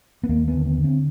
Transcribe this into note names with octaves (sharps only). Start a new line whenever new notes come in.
B3
D#2 A#3
B3
D3
B3
D3
C4